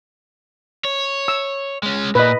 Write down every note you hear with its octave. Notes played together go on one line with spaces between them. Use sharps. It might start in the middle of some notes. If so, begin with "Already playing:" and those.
C#5
E6
G#3 C#4
A#2 B4 D#5